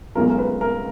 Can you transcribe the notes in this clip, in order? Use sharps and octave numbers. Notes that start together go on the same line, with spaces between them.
B1 B2 G#3 C#4 F4 A#4
A#4
B4
A#4